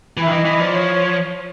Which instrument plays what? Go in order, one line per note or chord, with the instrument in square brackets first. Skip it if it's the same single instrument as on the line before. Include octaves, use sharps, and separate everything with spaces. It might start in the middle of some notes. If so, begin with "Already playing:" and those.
[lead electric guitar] E3
[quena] E5
[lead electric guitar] D#3
[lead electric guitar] E3 [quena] D#5
[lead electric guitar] E3
[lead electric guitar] F3 [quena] D5
[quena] C#5